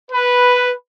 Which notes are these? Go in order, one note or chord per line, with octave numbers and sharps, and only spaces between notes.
B4